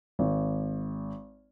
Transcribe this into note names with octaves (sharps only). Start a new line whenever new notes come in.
G#1